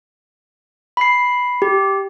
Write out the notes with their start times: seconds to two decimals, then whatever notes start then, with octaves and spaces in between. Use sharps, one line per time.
0.97 B5 C7
1.62 G4